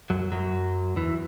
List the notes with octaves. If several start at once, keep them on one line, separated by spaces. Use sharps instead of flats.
F#2 F#3
F#2 F#3
E2 E3